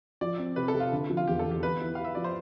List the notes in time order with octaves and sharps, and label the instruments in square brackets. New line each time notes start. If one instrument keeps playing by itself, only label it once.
[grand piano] F3 [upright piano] D5
[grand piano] C4
[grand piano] C3 [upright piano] B4
[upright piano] A4
[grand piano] C3
[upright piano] F4
[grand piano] D3
F3
[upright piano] F4
[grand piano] E2 [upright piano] G4
[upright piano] A4
[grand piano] E2
[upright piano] G4
[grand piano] B3 [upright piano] B4
[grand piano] E4
[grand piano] G4 [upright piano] F5
[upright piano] E5
[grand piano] F3 [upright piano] D5
[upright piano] C5